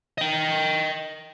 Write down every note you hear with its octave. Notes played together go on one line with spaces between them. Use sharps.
D#5 G5